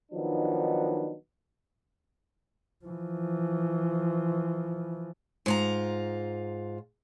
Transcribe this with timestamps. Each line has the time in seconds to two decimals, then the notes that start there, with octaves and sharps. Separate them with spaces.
0.12 D#3 F3 F#3 B3 D4 D#4
2.85 E3 F3
5.46 G#2 F4 A#5